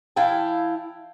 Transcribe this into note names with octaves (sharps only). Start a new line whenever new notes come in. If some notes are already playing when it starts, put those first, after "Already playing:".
E3 E4 F5 G5 A5